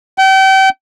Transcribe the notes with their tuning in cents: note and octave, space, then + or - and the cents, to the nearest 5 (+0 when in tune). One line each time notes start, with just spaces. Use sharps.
G5 -35